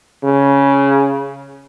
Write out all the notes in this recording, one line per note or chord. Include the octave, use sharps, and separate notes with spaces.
C#3